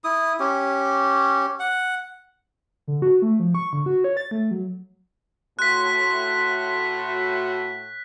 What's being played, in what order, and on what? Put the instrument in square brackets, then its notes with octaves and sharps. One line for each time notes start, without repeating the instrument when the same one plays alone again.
[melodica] E4 D#6
C#4 G4
F#5
[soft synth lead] D3
F#4
A3
F3
C#6
D3
F#4
C#5
A6
A3
F#3
[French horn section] A2 F#4 [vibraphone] C6 [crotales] F#6 B6